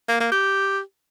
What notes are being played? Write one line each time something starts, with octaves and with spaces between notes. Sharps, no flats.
A#3
A#3
G4